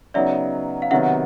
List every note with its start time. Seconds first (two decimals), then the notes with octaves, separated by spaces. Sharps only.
0.14 C#3 F#3 B3 D#4 D5 E5
0.82 F5
0.91 C3 D#3 F#3 B3 E5 F#5